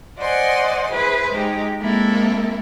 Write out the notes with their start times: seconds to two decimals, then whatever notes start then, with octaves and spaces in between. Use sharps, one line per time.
0.19 C5 D5 D#5 F#5 G#5 C6
0.90 E4 G#4 B4 C5
1.30 G#3 D#4 G4
1.80 G#3 A#3 C4 E4 A4 A#4